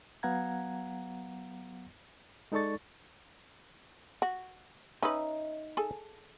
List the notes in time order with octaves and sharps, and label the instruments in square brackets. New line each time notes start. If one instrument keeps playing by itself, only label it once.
[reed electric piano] F#3 B3 F5 F#5 A#5 G#6
G#3 D#4 A4 D5 C#6 A6
[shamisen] F#4
[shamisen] C#4 B4 [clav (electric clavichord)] D#4 D#5 E5
[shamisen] G#4 A4 G#5